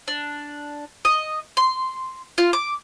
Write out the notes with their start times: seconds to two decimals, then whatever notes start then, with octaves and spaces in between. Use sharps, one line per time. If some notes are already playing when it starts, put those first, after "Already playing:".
0.08 D4
1.05 D#5
1.57 C6
2.38 F4
2.53 D6